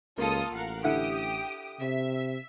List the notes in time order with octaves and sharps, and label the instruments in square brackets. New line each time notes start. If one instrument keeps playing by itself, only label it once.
[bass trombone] C#2 [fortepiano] A#3 [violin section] F4 A4 D#6
[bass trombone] A1 [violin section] A#4 F5 F#5
[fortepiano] D3 E4 F#5 [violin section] G4 D#6 D7
[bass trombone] C3 [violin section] E5